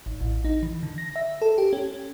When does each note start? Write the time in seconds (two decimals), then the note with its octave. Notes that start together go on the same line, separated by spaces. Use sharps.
0.06 G#1
0.21 A1
0.44 D#4
0.63 E3
0.83 D3
0.98 A#6
1.16 E5
1.42 A4
1.58 G4
1.73 C#4